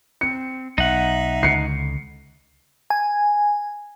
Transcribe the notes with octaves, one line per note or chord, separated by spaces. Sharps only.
C4 C#7
B1 D#4 E5 F#5
C#2 D3 C7 C#7
G#5